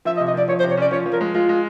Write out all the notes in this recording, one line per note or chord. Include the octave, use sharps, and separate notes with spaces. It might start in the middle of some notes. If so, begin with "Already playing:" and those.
F3 E5
D#5
C3
D#5
F3 D5
F3 C#5
C5
C3
C#5
C#4 D5
F3 C#5
F3
A#4
G#3
G#3 F4
G#3